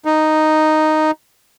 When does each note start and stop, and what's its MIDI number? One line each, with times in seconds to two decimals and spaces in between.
0.05 1.11 63